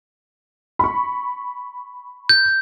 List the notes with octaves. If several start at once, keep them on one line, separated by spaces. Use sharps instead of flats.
B5 C#6
G6